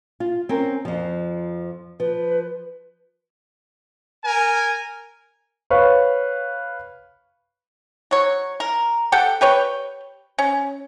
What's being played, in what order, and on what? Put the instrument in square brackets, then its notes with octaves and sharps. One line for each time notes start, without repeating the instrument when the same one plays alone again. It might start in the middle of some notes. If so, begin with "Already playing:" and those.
[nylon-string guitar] F4
C4 C#4 A#4
F2 F3
[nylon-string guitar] F3 [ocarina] B4
[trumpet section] A#4 G#5
[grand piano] B4 C#5 F5 C#6
[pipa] F#3 C#5
A#4
G4 A4 F#5 G5
G4 B4 C#5 G5
C#4